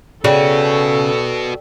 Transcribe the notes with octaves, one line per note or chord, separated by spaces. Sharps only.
C#3 F#4 A4 B4 D5 G5